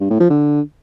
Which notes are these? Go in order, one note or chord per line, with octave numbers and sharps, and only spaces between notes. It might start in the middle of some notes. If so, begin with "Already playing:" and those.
G2
A2
F3
D3